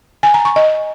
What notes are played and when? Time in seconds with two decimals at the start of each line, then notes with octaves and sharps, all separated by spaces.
0.23 G#5
0.34 A#5
0.45 C#6
0.56 D#5